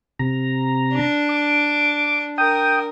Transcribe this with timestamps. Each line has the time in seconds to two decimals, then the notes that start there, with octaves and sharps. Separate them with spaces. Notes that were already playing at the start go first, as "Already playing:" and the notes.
0.19 C3 A#5
0.93 D4
1.29 D6
2.38 A#4 G5 D#6